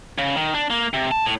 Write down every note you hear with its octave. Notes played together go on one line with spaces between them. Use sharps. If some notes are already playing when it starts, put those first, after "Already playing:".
C#3
D#3
D4
A#3
C3
A5
A2